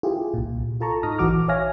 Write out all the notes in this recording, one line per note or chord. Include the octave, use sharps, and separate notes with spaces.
E4 F4 G4 G#4
C2 A#2
F4 A4 A5 A#5 C#6
G#2 D#4 D#6 F6 A#6
A#1 E3 F#4 D6 F6
C#5 E5 F5 G#5 F6 A#6